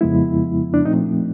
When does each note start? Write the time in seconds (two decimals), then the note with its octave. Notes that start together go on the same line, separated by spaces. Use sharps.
0.01 F2 C#3 F3 G#3 B3 E4
0.74 D4
0.85 A#2 F3 A3 C4 D#4